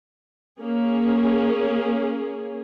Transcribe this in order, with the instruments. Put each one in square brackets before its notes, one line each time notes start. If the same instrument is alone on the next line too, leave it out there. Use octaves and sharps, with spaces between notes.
[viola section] A#3 C#4 G#4